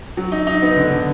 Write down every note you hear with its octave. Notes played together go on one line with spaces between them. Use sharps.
F#3
D#4
D#4
B3
D3
D3